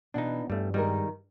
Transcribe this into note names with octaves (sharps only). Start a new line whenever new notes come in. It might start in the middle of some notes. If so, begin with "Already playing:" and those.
B2 E3 D4 D#4
G2 G3 A3 C#4
D#3 G3 G#3 A#4